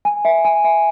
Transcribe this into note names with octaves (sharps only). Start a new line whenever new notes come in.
G#5
E5
G#5
E5